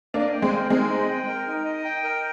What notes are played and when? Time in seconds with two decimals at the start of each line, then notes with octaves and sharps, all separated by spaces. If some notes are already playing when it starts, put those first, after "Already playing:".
0.14 A#3 D4 D#5
0.33 G5
0.42 G#3 C4
0.52 A#4
0.70 G#3 C4 D#4
0.90 D#5
1.09 G5
1.28 A#4
1.47 D#4
1.65 D#5
1.85 G5
2.04 A#4